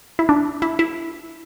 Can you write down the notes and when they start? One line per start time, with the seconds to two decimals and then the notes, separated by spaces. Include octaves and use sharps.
0.19 E4
0.29 D4
0.62 E4
0.79 E4